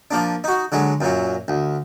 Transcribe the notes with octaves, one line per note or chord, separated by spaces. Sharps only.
F3 A#3 D4
D#4 F#4
D3 F#3 G#3
F#2 A#2 F#3
D2